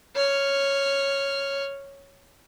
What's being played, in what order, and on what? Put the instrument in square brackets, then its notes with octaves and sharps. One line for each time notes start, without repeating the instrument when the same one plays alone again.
[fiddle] C#5 F6